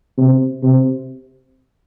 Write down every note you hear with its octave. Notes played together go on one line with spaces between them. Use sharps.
C3
C3